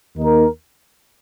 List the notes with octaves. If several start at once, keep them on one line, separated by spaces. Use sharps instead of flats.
D#2 D#3 A#3 D#4 A#4